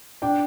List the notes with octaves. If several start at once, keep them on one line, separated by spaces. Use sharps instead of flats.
D4 G5